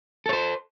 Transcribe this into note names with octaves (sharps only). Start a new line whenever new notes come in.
A4 C5 C#5